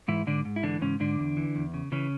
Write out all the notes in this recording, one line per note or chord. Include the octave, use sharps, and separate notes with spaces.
G#2 E3 E4
G#2 D3 D4
G#2
E4
D3 E3 D4
G#2 C#3 C#4
G#2 D3 D4
E2
E3
E2
C#3
C#3 E3 C#4